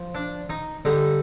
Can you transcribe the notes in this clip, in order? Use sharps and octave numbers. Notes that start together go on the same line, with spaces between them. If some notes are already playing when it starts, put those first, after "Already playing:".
Already playing: F3
D4
D#4
D3 G3 D#4